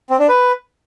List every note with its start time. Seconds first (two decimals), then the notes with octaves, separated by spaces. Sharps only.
0.10 C4
0.19 D4
0.29 B4